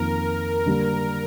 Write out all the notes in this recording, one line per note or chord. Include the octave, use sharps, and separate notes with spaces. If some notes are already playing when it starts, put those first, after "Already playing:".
Already playing: F2 D#3 A#3 A#4
D3 G3 A#3